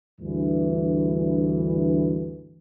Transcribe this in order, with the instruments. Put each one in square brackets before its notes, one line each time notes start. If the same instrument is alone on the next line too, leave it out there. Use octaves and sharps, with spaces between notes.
[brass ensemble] D2 G2 E3